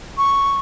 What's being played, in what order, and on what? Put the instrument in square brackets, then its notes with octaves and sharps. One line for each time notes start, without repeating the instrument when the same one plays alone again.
[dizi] C#6